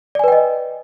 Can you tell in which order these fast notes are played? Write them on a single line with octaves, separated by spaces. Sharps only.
D5 G#5 B4 G5 D#5